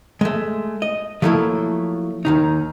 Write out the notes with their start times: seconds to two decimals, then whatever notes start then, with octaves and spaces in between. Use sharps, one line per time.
0.21 G#3 A3
0.82 D#5
1.22 F3 F#3 A3 A#3 E4 A4
2.25 D#2 D#3 D#4